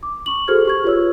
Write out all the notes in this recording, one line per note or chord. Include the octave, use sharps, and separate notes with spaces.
D6
C#6 F#7
F#4 G#4 A4 C5 F6 G#6
G4 C#6 G#6
F4 B4 C#5 E6